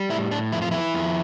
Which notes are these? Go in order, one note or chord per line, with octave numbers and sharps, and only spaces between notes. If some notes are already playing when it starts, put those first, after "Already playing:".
Already playing: G3
A2 E4
A2 D4
F2 E4
F4
E3 E4
F2